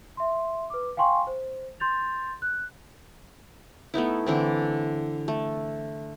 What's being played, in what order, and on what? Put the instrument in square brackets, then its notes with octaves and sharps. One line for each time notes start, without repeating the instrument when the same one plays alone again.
[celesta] E5 C6
B4 D6
F5 G5 G#5 C6 C#6
C5
C6 G6 A6 F7
F#6
[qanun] A3 B3 D#4 E4
D3 E3 C4
A3